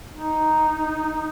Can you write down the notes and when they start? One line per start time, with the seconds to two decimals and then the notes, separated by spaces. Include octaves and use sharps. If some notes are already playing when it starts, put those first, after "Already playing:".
0.14 D#4